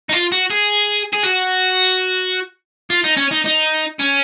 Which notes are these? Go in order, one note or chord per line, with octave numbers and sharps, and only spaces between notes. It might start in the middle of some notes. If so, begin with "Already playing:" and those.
D#4
F4
F#4
G#4
G#4
F#4
F4
D#4
C#4
D#4
D#4
C#4